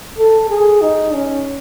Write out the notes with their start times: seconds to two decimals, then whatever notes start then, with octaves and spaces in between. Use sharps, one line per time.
0.19 A4
0.50 G#4
0.81 D#4
1.13 C#4